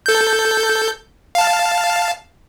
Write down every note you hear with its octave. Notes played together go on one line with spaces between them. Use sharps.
A4 G6
F5 A5